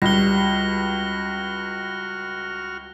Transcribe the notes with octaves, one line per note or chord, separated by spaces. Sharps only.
C#2 G3 F#4 F6 A#6 G7